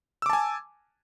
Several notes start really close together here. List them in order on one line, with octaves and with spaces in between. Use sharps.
E6 D6 A5 G#5